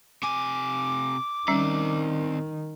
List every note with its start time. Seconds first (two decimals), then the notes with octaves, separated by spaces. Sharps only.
0.23 C3 G#5 D6
1.48 D#3 G3 C4 C#4 D5